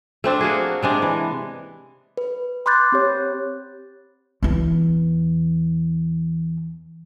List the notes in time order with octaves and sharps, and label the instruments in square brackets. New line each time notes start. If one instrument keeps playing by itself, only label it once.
[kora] A3 C4 D4
A#3 F#4 G#4
C3 G#3 D4
E3
[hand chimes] B4
B5 C6 D6 F#6 G6 A6
C4 G4 C#5
[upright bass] E2 E3